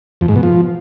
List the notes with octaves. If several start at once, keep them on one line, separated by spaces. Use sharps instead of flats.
F2
G#2
B2
F3